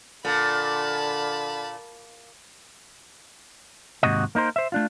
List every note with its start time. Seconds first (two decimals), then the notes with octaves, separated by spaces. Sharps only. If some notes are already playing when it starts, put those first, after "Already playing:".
0.25 A#2 D3 A5 B5
4.03 D#2 G#2 C3 F#4 D#5
4.35 A#3 D#4 A#4 C5
4.56 C5 E5
4.72 A3 D4 F4